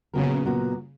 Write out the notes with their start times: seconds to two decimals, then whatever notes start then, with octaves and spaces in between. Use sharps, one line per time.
0.13 A#2 C#3 F#3 B3 F#4 A#4
0.45 A#2 F#3 B3 F#4 A#4